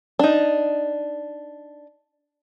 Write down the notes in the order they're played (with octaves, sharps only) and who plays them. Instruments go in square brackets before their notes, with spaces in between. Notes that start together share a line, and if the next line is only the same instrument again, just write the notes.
[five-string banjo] D4 D#4